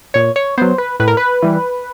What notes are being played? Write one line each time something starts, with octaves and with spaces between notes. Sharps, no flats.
A#2 C#5
C#5
F#3 B3 C5
B4
A2 B4
A#4
B4
E3 G3